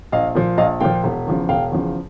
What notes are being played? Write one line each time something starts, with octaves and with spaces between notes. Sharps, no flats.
A#1 D#5 F5
A#2 F3
A#1 D#5 F5
A#2 F3 F5 G5
E1
E2 C#3 F3
E1 F5 G5
E2 C#3 F3